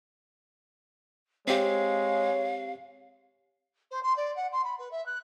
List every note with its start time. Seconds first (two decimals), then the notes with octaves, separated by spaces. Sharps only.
1.47 G#3 C4 G4 C#5 F5
3.91 C5
4.03 C6
4.16 D5
4.36 F#5
4.52 C6
4.64 B5
4.79 B4
4.91 E5
5.06 F#6